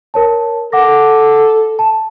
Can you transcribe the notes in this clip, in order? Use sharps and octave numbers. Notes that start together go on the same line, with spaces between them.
A#4 C#5 A5
A4 F#5 D6 A#6
A5